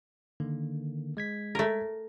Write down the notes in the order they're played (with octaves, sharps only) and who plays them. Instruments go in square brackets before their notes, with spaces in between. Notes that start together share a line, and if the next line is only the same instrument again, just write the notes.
[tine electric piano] D3 D#3 A#3
G#3 G#6 B6
[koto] A3 A#4